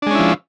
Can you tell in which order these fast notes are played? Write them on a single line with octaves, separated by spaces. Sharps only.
D4 G#3 C#4 E4 F3